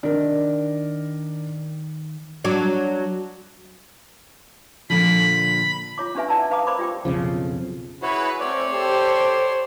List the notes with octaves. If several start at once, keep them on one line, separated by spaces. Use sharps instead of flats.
D#3 D4 A#4
F#3 D4
A#2 D3 F3 B5
F4 C#5 D6
C#4 D4 G4 B4 E5 G#5
E4 D5 F#5 A5 A#5 E6
B4 F5 A#5 D6 D#6
A#4 C5 D5 B5 D6
F4 G4 G5 D6
B1 F2 C#3 F3
E4 F#4 G#4 B4 C#5
A3 C4 C#4 C#5 D5
G4 A4 C5